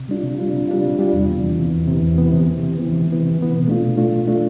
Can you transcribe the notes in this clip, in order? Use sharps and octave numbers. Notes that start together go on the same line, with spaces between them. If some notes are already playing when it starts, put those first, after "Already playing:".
Already playing: C3
G3 D4 F4
C3
G3 D4 F4
C3
G3 D4 F4
C3
G3 D4 F4
E2
C3 E3 B3
E2
C3 E3 B3
E2
C3 E3 B3
E2
C3 E3 B3
C3
E3 B3
C3
E3 B3
C3
E3 B3
C3
E3 B3
B2
A3 D4 F4
B2
A3 D4 F4
B2
A3 D4 F4